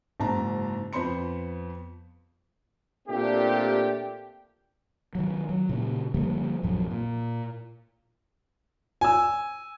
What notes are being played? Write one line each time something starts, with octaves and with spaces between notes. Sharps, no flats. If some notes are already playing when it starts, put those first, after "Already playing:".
F#1 G#2 A5 A#5
F2 B3 C5 B5 C6 C#7
A#2 A3 C4 D4 G4
D#3 F#3
F#3
A#2 C#3
D3 F3 G3 A#3
A#1 F#2 F3 F#3
A#2
G#5 E6